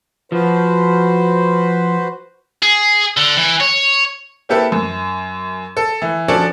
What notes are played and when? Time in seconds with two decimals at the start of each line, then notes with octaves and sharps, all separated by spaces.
0.32 F3 F#4 B4 C5
2.63 G#4
3.17 D3
3.37 E3
3.60 C#5
4.49 A#3 C4 E4 G4 A4 B4
4.72 F#2
5.77 A4
6.02 E3
6.28 F3 C#4 D4 F#4 A4 D5